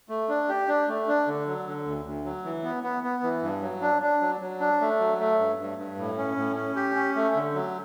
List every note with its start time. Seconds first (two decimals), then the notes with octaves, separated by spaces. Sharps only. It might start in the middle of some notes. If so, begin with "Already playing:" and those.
0.09 A3
0.29 D4
0.49 G4
0.68 D4
0.88 A3
1.08 D4
1.27 D3
1.46 F#3
1.67 D3
1.85 D2
2.05 D2
2.25 F#3
2.45 E3
2.64 B3
2.83 B3
3.03 B3
3.23 E3
3.43 G2
3.62 F#3
3.82 D4
4.02 D4
4.22 F#3
4.41 F#3
4.60 D4
4.81 A3
5.00 F#3
5.19 A3
5.39 G2
5.58 G2
5.78 G2
5.98 A2
6.18 C#4
6.37 A2
6.56 C#4
6.76 G4
6.95 C#4
7.15 A3
7.35 D3
7.54 F#3